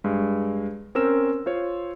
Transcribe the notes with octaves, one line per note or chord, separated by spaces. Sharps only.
G2 G#3
C4 C#4 A#4 C5 E6 E7
F4 C5 C#5